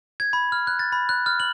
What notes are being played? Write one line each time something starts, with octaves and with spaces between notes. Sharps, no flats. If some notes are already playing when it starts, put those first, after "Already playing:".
G#6
B5
F6
F#6
A6
B5
F#6
F6
F#7